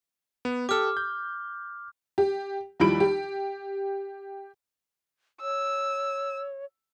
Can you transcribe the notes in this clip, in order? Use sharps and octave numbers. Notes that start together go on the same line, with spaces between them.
B3
G4 A4 D6 F6
G6
G4
D#2 F3 G3 E4 B5 D7
G4
C#5 E6